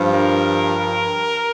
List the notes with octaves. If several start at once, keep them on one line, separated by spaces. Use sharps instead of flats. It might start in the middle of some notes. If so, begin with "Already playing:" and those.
Already playing: G2 F3
A#4